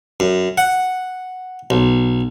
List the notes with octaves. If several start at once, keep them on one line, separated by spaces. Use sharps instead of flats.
F#2
F#5
B1